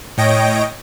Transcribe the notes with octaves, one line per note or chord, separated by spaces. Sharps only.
A2 C#5 D#5 G5 A#6 D7